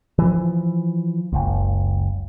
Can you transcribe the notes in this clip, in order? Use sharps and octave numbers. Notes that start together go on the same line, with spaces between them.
E3 F3
F#1 C#2